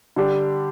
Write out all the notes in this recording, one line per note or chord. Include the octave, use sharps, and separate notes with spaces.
D3 G3 D4 G4